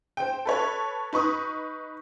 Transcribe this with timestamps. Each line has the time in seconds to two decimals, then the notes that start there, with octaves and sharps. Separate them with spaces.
0.17 C5 G5
0.45 A4 B4 C#5
1.13 D#4 B4 C#6 D#6